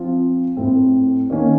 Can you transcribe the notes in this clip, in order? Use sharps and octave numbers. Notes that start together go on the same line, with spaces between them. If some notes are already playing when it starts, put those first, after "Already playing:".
Already playing: F3 C4 F4
A2 A3 C4
D#3 A#3 C#4